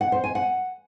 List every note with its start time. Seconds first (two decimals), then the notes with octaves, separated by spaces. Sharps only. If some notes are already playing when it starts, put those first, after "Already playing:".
0.01 F#5
0.12 C5
0.24 G#5
0.35 F#5